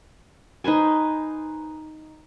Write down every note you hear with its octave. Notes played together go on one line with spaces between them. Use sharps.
D#4 B4 C5 G#5